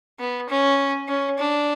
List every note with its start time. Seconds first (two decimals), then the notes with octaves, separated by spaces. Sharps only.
0.19 B3
0.49 C#4
1.08 C#4
1.38 D4